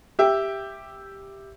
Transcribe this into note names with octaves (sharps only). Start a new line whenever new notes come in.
G4 E5 G5